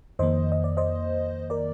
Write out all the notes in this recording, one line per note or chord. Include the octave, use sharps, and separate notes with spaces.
F2 D#3 A#3 C5 D#5
D#5
D5
C5 D#5
A#4 D5